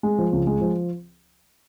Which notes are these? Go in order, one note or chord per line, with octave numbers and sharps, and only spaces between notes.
G#3
F3
C#2
G#3
F3